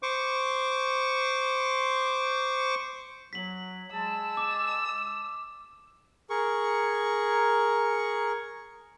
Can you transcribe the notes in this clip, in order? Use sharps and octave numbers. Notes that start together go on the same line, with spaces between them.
C5 C#6 D6
F#3 B6 F#7
G#3 A5 E6
D6
G#4 A#4 C#6